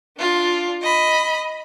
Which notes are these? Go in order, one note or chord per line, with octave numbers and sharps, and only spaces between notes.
D4 F4
D#5 B5